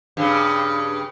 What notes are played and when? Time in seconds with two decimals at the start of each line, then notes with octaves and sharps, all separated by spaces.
0.17 G2 C#3